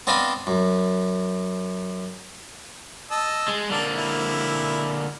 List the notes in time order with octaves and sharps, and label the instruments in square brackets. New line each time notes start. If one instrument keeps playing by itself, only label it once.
[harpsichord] B3 C4 D4 D#5 F5 B5
F#2
[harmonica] D#5 A5 E6
[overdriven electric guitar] G#3
[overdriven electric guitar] D3 A#3 [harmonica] D5 A5
[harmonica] E4